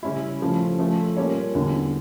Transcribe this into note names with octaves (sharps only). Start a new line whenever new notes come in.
C#3 G3 C#4 E4
C#3 F3 A3 C#4
F3 A3 C#4
G3 A#3 C#4 F4 C#5
E2 D3 G3